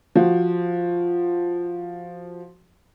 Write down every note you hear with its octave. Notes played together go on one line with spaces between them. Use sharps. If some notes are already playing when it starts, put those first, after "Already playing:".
F3 F#4